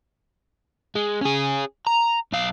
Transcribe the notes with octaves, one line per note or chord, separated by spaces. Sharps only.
G#3
C#4 G#4
A#5
B1 F5